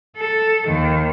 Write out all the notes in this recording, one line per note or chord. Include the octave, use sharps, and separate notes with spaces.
A4
D#2 D#3